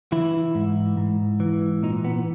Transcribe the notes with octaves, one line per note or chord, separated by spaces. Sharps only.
E3 E4
G#2
G#2
E3
A#2 D#4
B3